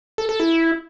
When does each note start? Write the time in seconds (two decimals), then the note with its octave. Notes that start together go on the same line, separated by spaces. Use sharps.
0.18 A4
0.29 A4
0.40 E4